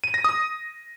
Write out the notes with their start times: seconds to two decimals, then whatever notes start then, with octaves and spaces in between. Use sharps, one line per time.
0.04 D#7
0.14 A#6
0.24 D#6